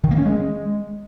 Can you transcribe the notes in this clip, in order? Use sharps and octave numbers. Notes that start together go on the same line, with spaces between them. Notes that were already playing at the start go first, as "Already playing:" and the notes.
D#3
A#3
C#4
G#3